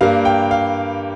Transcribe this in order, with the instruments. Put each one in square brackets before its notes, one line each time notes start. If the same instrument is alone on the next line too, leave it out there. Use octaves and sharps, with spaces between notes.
[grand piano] G2 G3 A#3 F5
G5
F5